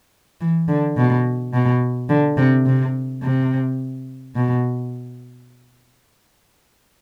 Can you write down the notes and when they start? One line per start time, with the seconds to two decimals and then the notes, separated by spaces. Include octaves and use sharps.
0.41 E3
0.68 D3
0.97 B2
1.53 B2
2.10 D3
2.38 C3
2.66 C3
3.23 C3
4.36 B2